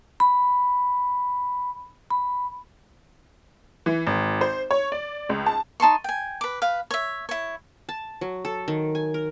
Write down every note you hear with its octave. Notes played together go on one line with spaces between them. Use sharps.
B5
B5
E3
G#1
C5
C#5
D5
C#2
A5
D#4 A5 C6 C#6
G5 G#5
B4 D6
B4 F5
C#5 E5
E4 C#5
A5
F#3
A4
D#3
G#5
A#4